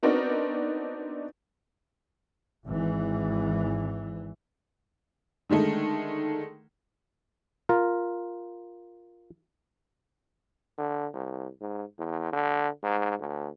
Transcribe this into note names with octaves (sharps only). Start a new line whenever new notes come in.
B3 C4 D4 D#4 F#4 A#4
G#1 E3
D3 D#3 G#3 A3 D#4
F4 A#4
D3
C2
G#2
E2
D3
G#2
D2